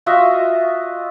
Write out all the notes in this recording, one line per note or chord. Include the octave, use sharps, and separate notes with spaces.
F4 F#4 D#5 E5